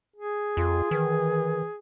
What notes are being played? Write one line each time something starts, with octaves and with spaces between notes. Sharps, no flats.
G#4
F2 F4
D#3 E3